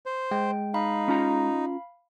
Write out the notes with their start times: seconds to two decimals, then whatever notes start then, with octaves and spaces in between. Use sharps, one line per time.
0.06 C5
0.31 G#3 G5
0.74 D#4 F5 B5
1.08 C#4 F4 A#5